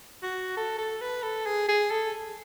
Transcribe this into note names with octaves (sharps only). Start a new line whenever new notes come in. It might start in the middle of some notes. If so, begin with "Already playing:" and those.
F#4
A4
A4
B4
A4
G#4
G#4
A4